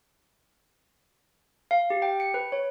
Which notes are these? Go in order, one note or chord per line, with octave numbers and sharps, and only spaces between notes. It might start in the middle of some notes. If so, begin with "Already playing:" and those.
F5
G4
G5
C#7
B4
C#5